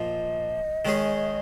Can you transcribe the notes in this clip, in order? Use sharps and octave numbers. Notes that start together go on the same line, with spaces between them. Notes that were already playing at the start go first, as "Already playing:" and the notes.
Already playing: A#2 F3 D#5
D#3 G#3 C#4 G#4